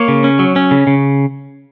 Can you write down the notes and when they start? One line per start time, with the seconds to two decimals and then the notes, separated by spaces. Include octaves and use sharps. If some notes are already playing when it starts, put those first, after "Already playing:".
Already playing: A#3 C#5
0.08 C#3
0.24 C#4
0.39 F#3
0.56 C#4
0.71 C#3
0.87 C#3